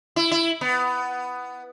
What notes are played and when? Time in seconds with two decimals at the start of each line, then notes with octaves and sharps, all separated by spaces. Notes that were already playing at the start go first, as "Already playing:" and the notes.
0.16 E4
0.31 E4
0.61 B3